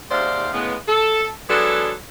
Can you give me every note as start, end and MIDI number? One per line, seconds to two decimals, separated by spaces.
0.11 0.50 39
0.11 0.50 44
0.11 0.50 48
0.11 0.50 72
0.11 0.50 74
0.11 0.50 77
0.53 0.76 45
0.53 0.76 49
0.53 0.76 56
0.53 0.76 59
0.88 1.26 69
1.49 1.92 54
1.49 1.92 56
1.49 1.92 59
1.49 1.92 62
1.49 1.92 69